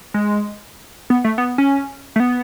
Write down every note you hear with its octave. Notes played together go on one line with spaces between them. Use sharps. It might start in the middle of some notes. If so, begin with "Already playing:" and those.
G#3
B3
A3
B3
C#4
A3
B3